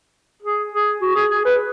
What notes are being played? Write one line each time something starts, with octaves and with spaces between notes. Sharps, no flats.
G#4
G#4
F#4
G#4
G#4
B4